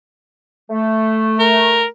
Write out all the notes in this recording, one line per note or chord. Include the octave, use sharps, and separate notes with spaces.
A3
A#4